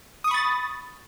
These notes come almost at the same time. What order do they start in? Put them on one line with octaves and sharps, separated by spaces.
D#6 C#6 B5 A6